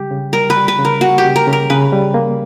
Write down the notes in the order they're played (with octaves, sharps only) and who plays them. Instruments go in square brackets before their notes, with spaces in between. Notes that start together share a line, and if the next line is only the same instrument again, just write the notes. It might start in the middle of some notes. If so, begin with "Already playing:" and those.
Already playing: [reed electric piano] C#3 G3 [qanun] G4
[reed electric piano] C#3
[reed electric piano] G3 [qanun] A#4
[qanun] B4
[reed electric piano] G3
[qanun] B4
[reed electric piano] C#3
[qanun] A#4
[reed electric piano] A#3 [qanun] F#4
[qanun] G4
[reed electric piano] C#3
[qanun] A#4
[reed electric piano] C#3
[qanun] A#4
[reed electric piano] C#3 [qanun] B4
[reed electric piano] G3
A#3